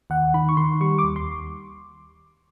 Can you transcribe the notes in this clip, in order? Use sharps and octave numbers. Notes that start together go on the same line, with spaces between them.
D#2 F#5
D#3 B5
C#6
D#3 C6
G3 C#6
D6
D#2
C6